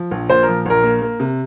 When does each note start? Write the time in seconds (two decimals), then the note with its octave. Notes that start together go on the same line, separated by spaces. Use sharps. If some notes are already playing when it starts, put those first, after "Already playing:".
Already playing: F3
0.11 A#1
0.30 A#2 C5
0.43 F3 A#4
0.66 A#1 A#4
0.84 A#3
1.02 A#3
1.20 C3